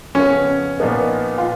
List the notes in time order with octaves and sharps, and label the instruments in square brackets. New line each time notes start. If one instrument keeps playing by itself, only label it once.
[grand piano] F2 C#3 F3 B3 [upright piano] C#4
[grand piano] A#2 F3 B3 D#4
[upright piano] F4